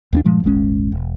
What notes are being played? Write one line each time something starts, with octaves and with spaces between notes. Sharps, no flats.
D#2 A#3 D4
G2 A#2 F3 G#3
D#1 G#1 G#3 C#4
E1